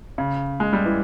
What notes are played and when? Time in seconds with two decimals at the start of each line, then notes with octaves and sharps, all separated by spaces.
0.18 C#3
0.60 G#3
0.73 G3
0.85 E3